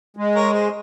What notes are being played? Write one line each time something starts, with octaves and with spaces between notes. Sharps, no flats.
G#3
A#4 C#5
G#4 C5